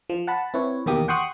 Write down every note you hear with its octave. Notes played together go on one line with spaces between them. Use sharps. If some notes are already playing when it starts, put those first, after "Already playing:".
F3
F#5 A5 B5
C4 E4 B4 C#5
E2 B2 D#3 A#3 G4 D#6
F#5 G5 C6 C#6 D#6 F#6